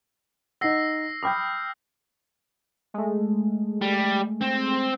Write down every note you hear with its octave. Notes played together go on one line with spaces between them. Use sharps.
D#4 F#5 E6 A#6 C7
G5 B5 D6 D#6 F6 G6
G#3 A3
G3
C4